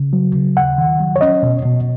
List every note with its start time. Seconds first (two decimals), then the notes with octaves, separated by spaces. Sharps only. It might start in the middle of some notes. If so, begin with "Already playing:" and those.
Already playing: C#3
0.13 F#3
0.35 C#3
0.56 D#2 F#5
0.78 D#3
1.00 F#3
1.16 C#5
1.21 C#4 D#5
1.43 B2
1.65 B2